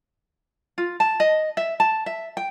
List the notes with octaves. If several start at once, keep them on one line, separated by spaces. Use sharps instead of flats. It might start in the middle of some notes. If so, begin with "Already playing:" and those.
F4
A5
D#5
E5
A5
E5
G5